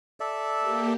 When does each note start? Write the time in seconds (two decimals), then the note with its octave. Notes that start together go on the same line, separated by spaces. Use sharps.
0.20 A4 D5 E5
0.59 A#3 G4